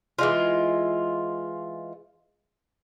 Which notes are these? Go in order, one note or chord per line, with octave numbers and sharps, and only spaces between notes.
E3 G#3 F4